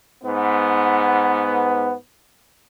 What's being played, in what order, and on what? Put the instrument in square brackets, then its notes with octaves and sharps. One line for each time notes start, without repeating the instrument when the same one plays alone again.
[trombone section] G#2 B3